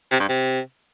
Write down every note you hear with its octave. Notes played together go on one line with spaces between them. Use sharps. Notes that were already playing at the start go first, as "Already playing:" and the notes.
C3
G2
C3